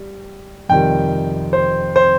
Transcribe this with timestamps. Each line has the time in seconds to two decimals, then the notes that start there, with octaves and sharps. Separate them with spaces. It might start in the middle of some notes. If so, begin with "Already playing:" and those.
Already playing: G3
0.69 F2 C3 D#3 G3 G5
1.53 C5
1.96 C5